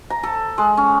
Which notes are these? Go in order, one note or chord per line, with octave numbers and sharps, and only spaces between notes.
A#5
A4
G#3
C#4